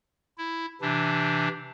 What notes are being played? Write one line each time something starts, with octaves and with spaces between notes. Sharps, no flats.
E4
C3 E3 D4